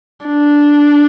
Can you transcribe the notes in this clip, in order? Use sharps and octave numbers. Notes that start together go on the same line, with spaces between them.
D4